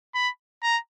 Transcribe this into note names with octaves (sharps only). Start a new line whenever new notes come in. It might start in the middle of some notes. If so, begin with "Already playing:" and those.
B5
A#5